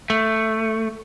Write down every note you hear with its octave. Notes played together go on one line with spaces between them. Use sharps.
A3